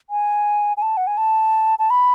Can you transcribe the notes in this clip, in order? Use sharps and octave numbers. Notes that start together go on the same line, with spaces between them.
G#5
G#5
A5
F#5
G#5
A5
A5
B5